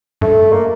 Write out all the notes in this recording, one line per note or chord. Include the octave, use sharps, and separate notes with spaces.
G2 A3
A#3